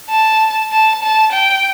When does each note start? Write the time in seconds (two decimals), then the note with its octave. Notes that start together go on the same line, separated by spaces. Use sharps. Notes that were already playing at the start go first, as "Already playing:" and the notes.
0.10 A5
0.72 A5
1.03 A5
1.32 G5